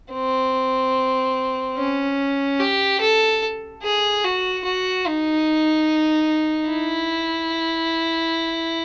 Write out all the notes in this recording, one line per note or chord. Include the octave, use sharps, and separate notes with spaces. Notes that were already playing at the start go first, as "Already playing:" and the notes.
C4
C#4
G4
A4
G#4
F#4
F#4
D#4
E4